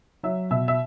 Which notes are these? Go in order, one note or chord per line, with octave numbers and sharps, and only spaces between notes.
F#3 E5
B2 E5
E5